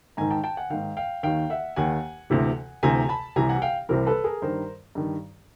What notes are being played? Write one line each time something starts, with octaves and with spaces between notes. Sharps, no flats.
G#2 D#3 G#5 A#5
G5 A5
G5 A5
F#5 G#5
G#2 D#3 F5 G5
F5 G5
D#2 D#3 F5 G5
E5 F#5
D#2 D#3 F#5 G#5
D2 C3 E3
D2 C3 E3 G#5 A#5
A5 B5
C2 C3 E3 G#5 A#5
F#5 G#5
F5 G5
C2 C3 E3 A#4 C5
A4 B4
G#4 A#4
G2 D#3 A#4 C5
G2 D#3